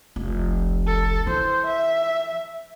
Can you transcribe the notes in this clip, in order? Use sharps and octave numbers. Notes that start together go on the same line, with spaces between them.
F1 C2
A4
E3 C5
E5